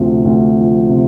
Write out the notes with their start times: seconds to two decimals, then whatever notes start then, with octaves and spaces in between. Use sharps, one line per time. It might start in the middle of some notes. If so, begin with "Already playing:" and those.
Already playing: D2 C3 F3
0.25 D2
0.57 F3
0.89 C3